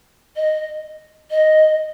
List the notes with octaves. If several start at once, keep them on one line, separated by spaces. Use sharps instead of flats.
D#5
D#5